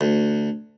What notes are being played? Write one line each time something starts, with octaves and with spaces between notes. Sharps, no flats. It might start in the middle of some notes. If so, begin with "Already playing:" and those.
D2